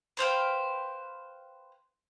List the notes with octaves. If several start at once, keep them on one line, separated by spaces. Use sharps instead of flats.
B4 C5 F5 G5